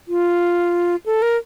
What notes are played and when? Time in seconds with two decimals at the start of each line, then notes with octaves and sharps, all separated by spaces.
0.08 F4
1.06 A4
1.22 A#4